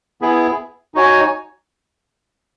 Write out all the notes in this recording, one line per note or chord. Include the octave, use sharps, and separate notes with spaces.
B3 E4 G#4
D#4 F#4 C#5 G#5